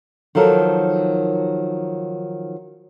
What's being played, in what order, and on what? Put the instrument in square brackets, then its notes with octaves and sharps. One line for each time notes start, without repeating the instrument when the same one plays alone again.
[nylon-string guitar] D#3 F3 F#3 A4 A#4